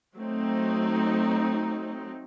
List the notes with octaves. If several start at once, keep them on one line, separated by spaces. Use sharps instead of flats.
F#3 A3 C4 D#4